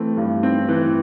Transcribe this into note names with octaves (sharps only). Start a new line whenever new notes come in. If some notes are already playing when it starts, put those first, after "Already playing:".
Already playing: E3 A3 C4
G2
C4
E3